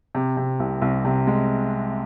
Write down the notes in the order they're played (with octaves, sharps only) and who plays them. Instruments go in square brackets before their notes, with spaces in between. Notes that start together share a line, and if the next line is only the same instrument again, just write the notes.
[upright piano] C3
C3
C2
C2
C3
G#3